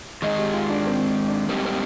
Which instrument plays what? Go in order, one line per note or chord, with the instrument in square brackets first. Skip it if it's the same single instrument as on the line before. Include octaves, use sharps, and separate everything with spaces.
[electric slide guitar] G#2 D#3 G#3 D#4 [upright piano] D#5
[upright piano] G4
F4
D4
C4
D4
[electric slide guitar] G#2 G3 A#3 D#4 G4 [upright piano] C4
[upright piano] C4